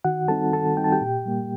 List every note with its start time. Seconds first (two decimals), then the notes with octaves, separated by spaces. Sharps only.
0.04 D#3 F#4 F#5
0.28 G3 C4 D#4 A4 A5
0.53 D#3 A4 A5
0.77 G3 C4 D#4 G5
0.84 A5
0.92 G4 G5
1.01 A#2
1.26 G3 A#3